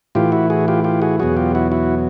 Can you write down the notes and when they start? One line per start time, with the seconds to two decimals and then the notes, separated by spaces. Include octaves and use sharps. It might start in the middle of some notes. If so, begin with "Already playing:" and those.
0.15 A2 E3 F4 G4
0.32 E4 F#4
0.50 F#4 G#4
0.68 F4 G4
0.84 F4 G4
1.02 F#4 G#4
1.19 E2 B2 F#3 F#4 G#4
1.36 F4 G4
1.55 E4 F#4
1.72 E4 F#4